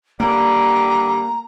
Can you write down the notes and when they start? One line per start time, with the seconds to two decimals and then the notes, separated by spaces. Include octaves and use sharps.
0.20 D3 G3 A#3 A#5